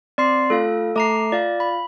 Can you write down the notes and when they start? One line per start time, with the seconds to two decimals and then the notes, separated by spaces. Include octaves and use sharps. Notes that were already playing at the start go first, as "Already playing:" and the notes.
0.18 C4 D5 C6 C7
0.50 A3 F4 A4 F5
0.96 A3 A4 A#5 D6 C7
1.32 F4 D5 F5
1.60 B5